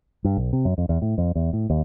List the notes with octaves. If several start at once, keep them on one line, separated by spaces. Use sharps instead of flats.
G2
B1
C3
F#2
F2
E2
A2
F2
E2
A2
D#2